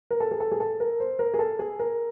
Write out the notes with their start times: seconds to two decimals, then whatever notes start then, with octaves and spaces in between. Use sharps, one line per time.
0.11 A#4
0.20 A4
0.31 G#4
0.40 A4
0.52 G#4
0.60 A4
0.80 A#4
1.00 C5
1.19 A#4
1.34 G#4
1.39 A4
1.59 G#4
1.79 A#4